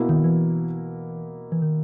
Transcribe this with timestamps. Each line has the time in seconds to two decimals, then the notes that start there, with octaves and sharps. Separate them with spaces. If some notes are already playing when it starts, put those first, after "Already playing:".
Already playing: B2 A#3 E4
0.09 D#3
0.24 E3
1.52 E3
1.62 D#3